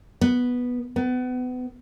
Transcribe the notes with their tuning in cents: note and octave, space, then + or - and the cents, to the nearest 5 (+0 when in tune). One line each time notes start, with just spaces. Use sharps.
B3 -5
B3 +30